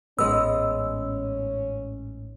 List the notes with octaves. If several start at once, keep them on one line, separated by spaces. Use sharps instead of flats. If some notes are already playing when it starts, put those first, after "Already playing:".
A1 G#2 G#3 B3 C#4 E6